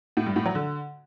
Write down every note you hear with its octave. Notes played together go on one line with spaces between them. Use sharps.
A2
G2
A2
F#3
D3